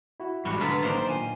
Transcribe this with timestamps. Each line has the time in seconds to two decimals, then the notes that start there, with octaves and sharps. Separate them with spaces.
0.20 E4 F#4
0.45 G#2 E3 G3 F#4 C#6
0.61 D3 F#3 F#4 B4 F6 A6
0.83 D#3 A#3 D4 A#4 C5
1.09 A#2 G#5